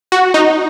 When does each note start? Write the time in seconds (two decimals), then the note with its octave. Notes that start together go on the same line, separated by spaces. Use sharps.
0.12 F#4
0.34 D#4